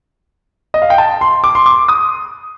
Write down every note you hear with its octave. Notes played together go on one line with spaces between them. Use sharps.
D#5
F5
G5
A5
C6
D6
C6
D6
D#6